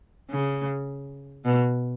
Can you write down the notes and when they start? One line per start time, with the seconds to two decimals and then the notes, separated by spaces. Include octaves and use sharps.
0.30 C#3
1.45 B2